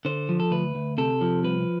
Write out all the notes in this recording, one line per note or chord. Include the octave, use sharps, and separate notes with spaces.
D3 C5
F3
A4
D2 B4
D2
C3 A4
F3
C2 B4